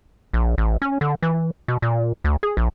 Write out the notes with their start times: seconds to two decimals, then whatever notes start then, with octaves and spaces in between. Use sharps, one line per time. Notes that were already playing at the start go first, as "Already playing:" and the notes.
0.33 A#1
0.58 A1
0.82 C#4
1.01 D3
1.22 E3
1.68 B2
1.82 A#2
2.24 D2
2.43 G#4
2.57 A#1